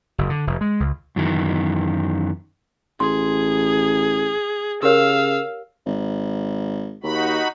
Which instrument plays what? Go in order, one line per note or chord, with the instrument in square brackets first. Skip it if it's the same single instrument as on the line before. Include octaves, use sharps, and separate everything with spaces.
[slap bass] F#1
D3
F1
G#3
C#2
[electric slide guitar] F#2 D#3 E3
[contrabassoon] A1 [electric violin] G#4 [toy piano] C6
[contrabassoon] C#3 [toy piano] G4 A#4 C#5 [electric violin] F5 E6
[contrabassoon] G#1
[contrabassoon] D#2 [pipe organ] D#4 F#4 B5